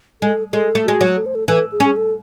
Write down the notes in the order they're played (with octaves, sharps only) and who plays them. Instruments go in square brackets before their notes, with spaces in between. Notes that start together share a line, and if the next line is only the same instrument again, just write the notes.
[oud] G#3 [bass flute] A4
[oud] G#3 [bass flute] A4
[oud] A3
[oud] G#3 [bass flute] F#4
[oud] F#3
[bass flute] A4
C5
A4
[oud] E3 [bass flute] A4
[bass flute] G#4
[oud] C#4
[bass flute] G#4
A4